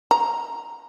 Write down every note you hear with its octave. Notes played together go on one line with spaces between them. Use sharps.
A#5